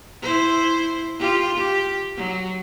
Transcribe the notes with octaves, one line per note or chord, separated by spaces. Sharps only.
E4 C5
F4 G4
G4
F#3